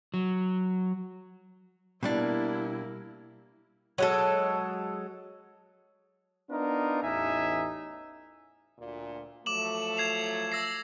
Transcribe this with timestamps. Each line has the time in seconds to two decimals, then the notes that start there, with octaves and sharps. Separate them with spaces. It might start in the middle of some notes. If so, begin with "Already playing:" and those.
0.14 F#3
2.03 B2 G3 A#3 D4 E4
3.98 F#3 G#3 A4
6.50 B3 D4 D#4 F4 A#4
7.02 A1 E2 D#4 E5 G#5
8.79 D2 A#2
9.46 F3 F#3 A3 D6 E7 F#7
9.97 G#6 C7 F7
10.52 E6 A#6 C7